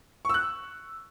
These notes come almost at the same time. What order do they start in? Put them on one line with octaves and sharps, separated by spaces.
C#6 E6 F#6